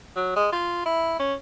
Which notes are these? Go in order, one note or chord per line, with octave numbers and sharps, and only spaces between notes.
F#3
G#3
F4
E4
C#4